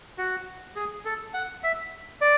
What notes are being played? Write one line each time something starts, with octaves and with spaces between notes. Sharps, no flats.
F#4
G#4
A4
F#5
E5
D5